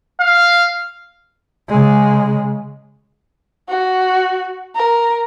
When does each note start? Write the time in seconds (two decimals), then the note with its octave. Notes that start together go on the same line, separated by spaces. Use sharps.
0.20 F5
1.68 C#3 G#3
3.69 F#4
4.76 A#4